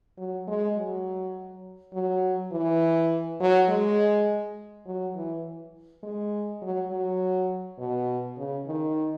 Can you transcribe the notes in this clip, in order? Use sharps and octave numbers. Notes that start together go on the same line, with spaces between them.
F#3
G#3
F#3
F#3
E3
F#3
G#3
F#3
E3
G#3
F#3
F#3
B2
C#3
D#3